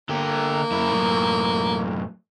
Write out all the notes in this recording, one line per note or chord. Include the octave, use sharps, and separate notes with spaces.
D3 A#3 G4
F#2 E4
F#2 A2